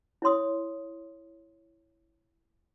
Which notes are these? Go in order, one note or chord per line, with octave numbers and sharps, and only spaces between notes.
E4 C#5 C6 D#6